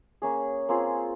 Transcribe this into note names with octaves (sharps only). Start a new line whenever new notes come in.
A#3 C#4 G#4
A#3 C4 F4 G#4